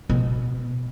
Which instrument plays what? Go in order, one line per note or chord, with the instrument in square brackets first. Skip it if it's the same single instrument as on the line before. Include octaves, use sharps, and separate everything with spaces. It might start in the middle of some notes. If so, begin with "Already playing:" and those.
[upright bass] B2